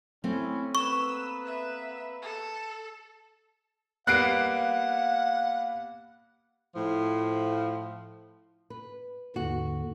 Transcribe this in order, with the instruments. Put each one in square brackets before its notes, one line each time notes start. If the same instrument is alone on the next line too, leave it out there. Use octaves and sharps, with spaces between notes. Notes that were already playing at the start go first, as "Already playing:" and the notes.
[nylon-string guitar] A3 C4 [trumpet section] C#4 E4
[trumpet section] A#3 B3 B4 [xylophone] C#6 [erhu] E6
[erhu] E5
A4
[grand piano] G3 A#3 B3 [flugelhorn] F5 [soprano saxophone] F#5 [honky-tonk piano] F#6 C7 D7
[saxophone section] A2 F3
[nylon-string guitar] B4
[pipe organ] D#2 G#2 D3 [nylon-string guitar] F#4